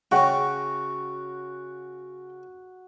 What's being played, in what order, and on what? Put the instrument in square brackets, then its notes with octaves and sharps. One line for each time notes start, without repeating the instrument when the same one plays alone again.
[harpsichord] C#3 C#4 [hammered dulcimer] F#4 [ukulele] F#5 G5